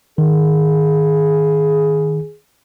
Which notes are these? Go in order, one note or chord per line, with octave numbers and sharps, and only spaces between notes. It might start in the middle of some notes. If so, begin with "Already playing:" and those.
D#3 G#4